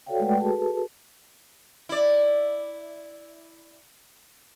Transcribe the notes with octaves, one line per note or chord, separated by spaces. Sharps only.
F#4 A4 C#5 D5 F5 G5
G#3 A3 B4 D5 F#5 G5
F#4 G#4 A4 B4 A5
E4 D5